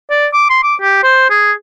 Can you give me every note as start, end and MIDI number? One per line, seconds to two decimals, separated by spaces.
0.10 0.26 74
0.33 0.45 86
0.50 0.59 84
0.63 0.75 86
0.81 1.03 67
1.03 1.30 72
1.30 1.52 68